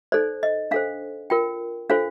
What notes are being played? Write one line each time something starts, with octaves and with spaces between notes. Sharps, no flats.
D#4 A4 C5 D5
D#5
D4 A4 C5 F5
F4 A#4 G5
D4 F4 A4 C5 F5